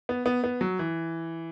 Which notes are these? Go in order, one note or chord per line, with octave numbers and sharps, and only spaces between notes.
B3
B3
B3
F#3
E3